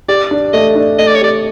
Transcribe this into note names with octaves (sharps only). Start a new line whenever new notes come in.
G4 D5
D4
A3 D#5
D4
A3 D#5
D5
C#5
G4 D5